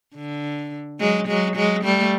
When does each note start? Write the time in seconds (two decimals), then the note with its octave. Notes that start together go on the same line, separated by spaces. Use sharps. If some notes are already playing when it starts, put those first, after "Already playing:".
0.16 D3
1.00 F#3 G#3
1.28 F#3 G#3
1.56 F#3 G#3
1.84 G3 A3